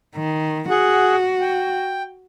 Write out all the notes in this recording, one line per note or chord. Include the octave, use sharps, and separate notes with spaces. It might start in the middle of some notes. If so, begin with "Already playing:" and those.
D#3
F#4 G#4 F#5
G5